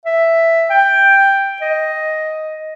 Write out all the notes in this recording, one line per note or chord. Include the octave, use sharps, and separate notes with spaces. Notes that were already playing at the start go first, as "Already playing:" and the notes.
E5
G5
D#5